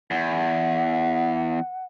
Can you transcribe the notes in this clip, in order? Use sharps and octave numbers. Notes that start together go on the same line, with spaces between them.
E2 F#5